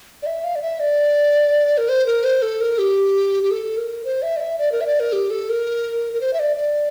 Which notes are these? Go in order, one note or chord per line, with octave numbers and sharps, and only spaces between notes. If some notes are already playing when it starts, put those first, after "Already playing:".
D5
E5
F5
D5
E5
D5
A#4
C5
A#4
C5
A4
A#4
G4
G4
A4
A#4
C5
E5
D5
E5
D5
A#4
E5
D5
A#4
G4
A4
A#4
A#4
C5
E5
D5
D5